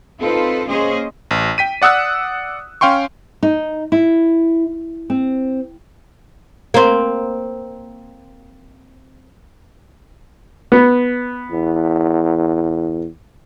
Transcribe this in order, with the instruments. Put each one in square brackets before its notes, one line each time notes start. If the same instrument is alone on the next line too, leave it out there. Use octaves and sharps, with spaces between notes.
[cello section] C4 D#4 F4 A4 B4 C5
A#3 C#4 G#4 C5 D#5
[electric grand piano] A1
G5 B6 D#7
D5 F#5 D#6 E6 F#6
C#4 F5 G5 C6 C#6
[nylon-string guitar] D#4
E4
C4
[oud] A#3 C4
[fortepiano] B3
[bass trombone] E2